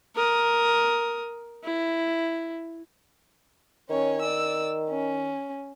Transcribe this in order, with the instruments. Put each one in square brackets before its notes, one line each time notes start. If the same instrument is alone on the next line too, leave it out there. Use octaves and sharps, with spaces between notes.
[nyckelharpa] A#4 D#6
E4
[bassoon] D#3 [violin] C#4 C#5
[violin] D5 E6
C#4